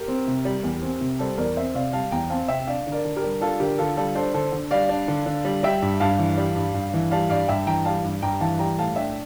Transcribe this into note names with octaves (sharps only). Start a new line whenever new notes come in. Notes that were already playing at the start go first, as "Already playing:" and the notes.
Already playing: G4 A#4
C4
C3
G3
E2
C4
C3
G3 A4 C5
E2 A#4 D5
C4 C5 E5
C3 D5 F5
G3 F5 A5
E2 G5 A#5
C4 F5 A5
C3 E5 G5
D4 D5 F5
D3
A#4 D5
D3
G4 A#4
G3
D4 F4 A4
D3 G4 A#4
D3 F4 A4
G3 F4 A4
D4 A4 C5
D3 A4 C5
D3
G3 D5 F5
D4
D3
D3
G3
G3 E5 G5
G2
G2 F5 A5
E3
G3
G2
G2
E3
G3 F5 A5
G2 D5 F5
G2 E5 G5
E3 G5 A#5
G3 F5 A5
G2
G2 G5 A#5
E3 F5 A5
G3 G5 A#5
A2 F5 A5
D4 E5 G5